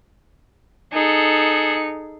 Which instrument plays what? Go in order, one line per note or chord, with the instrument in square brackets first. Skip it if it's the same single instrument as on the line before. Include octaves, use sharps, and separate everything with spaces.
[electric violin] D#4 C#7 [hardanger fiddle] G#4 A4